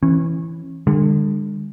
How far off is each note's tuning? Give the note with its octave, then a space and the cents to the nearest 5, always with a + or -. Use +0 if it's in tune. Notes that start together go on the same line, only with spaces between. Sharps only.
E3 +0 C#4 -30
D3 +25 G#3 -40